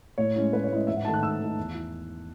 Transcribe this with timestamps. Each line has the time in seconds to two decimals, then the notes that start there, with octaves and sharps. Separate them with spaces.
0.18 A2 C#5
0.35 G#3 C#4 E4
0.52 A2 B4
0.64 C#5
0.71 G#3 C#4 E4 D#5
0.87 G#2 E5
0.96 F#5
1.05 D#3 A3 D#4 A5
1.14 F#6
1.22 G#2 E6
1.40 D#3 A3 D#4
1.57 E2
1.74 E4